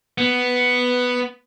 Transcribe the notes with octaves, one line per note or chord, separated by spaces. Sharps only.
B3